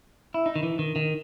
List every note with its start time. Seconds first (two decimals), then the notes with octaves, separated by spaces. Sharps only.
0.34 E4
0.46 D#4
0.56 D#3
0.63 E3
0.79 D#3
0.96 D#3